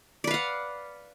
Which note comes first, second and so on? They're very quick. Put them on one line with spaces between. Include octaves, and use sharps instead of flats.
D5 B4 F5 F#5